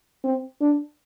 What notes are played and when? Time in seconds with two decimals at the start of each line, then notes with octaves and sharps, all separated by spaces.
0.24 C4
0.61 D4